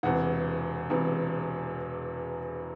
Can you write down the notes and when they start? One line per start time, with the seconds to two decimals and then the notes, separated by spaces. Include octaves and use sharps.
0.03 E1 E2 C3 F#5
0.90 E1 E2 C3